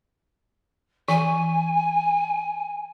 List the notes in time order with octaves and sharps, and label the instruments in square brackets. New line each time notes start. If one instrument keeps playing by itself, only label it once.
[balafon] E3 [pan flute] G#5